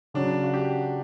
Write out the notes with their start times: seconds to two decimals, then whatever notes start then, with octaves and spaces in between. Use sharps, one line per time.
0.14 C#3 F#3 C#4 D4
0.43 F#4
0.54 G4